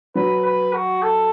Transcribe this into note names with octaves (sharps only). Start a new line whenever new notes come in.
F#3 B4
B4
F#4
A4